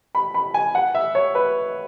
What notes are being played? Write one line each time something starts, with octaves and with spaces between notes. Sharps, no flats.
B5
B5
G#5
F#5
E5
C#5
B4